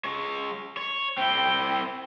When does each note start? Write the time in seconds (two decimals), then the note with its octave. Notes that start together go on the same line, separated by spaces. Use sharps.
0.04 G#3 C#5
0.77 C#5
1.17 C4 E4 G5